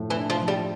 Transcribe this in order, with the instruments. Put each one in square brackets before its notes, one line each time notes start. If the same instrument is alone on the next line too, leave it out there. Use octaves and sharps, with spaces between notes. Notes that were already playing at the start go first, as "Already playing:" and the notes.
Already playing: [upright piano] A2 F3 A3
[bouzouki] E3
[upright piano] D4
[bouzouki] F3
[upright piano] F3
[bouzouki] G3